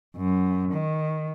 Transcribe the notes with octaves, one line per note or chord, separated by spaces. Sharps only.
F#2
D#3